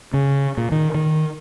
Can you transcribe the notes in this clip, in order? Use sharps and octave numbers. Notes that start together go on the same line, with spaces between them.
C#3
A#2
D#3
D#3